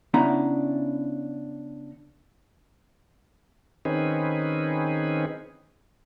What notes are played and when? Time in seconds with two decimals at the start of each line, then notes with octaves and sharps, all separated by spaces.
0.14 C#3 B3 C#4 D4 E4 A#5
3.85 D#3 C4 C#4 D#4 G#4 B4